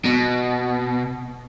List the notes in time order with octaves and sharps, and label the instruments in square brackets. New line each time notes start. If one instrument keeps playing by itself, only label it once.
[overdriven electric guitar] B2